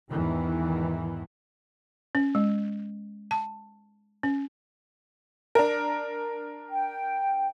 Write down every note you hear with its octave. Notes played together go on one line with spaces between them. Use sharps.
E2 G#2 D#3 E3
C#4
G#3
A5
C#4
D4 A#4
G5